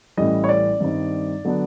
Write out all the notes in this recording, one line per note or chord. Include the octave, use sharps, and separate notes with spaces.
A1 A2 E3 G3 D#5
C#5
D5
G2 D#3 G3 C4 D#4
D3 F#3 B3 D4